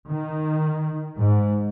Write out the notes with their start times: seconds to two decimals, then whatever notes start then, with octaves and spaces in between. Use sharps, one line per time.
0.10 D#3
1.19 G#2